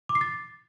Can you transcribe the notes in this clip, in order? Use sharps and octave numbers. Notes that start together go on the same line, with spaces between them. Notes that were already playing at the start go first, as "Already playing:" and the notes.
D6
C7
A6